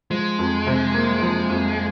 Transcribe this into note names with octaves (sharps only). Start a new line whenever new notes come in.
F3 G#3
F2
C3
A#3
F3
F2